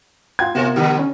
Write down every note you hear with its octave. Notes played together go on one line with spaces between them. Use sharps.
F4 G5 G#6
C3 B3 C4 F4 F#4 A#4
D3 G3 G4 B4
C#4